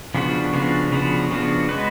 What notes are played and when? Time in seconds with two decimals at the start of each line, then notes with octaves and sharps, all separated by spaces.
0.15 C#3 F3 B3 D4 F#4
0.53 C#3 F3 B3 D4 F#4
0.92 C#3 F3 B3 D4 F#4
1.31 C#3 F3 B3 D4 F#4
1.69 G#3 B3 F#4 B4